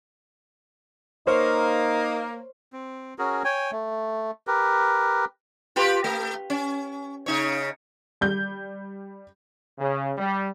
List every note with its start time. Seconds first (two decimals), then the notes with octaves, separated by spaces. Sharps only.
1.27 A#3 D#4 C5 C#5 F6
2.73 C4
3.19 C#4 F#4 G#4 A#4
3.44 C#5 G5 G#5
3.72 A3
4.47 G4 A#4 B4
5.76 F4 G4 B4
6.04 A3
6.50 C#4
7.26 C#3 D#4 C#5
8.21 G3 G6
9.79 C#3
10.18 G3